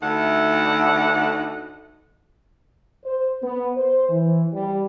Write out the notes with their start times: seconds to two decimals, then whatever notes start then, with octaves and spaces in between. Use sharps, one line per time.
0.02 D2 D#4 E4 A4 F#5
3.04 C5
3.41 B3
3.75 C5
4.09 E3
4.52 G3